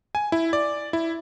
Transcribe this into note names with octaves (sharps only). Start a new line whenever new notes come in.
G#5
E4
D5
E4